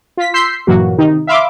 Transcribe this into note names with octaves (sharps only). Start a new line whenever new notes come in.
F4 B6
C6 E6 G6 B6 C7
G2 A#2 E3 F#3 A#3 F#4
C3 D#3 D#4
E5 F5 B5 C6 D6